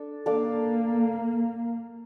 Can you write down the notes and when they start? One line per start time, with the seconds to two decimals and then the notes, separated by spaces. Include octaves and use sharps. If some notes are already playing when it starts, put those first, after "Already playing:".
Already playing: D4 A4
0.26 A#3 D4 A4 D5 F5